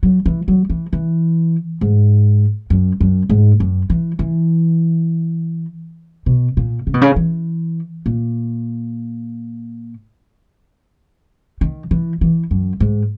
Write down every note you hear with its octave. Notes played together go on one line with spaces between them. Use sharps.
F#3
E3
F#3
E3
E3
G#2
F#2
F#2
G#2
F#2
E3
E3
B2
A#2
C#3
B2
C#3
E3
A#2
D#3
E3
E3
F#2
G#2